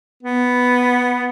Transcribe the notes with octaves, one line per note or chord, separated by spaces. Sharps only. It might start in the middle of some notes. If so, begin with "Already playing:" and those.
B3